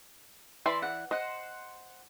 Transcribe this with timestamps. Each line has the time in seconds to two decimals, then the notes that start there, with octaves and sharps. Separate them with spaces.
0.66 E3 D5 E5 C6
0.82 F#5
1.11 C5 D#5 F#5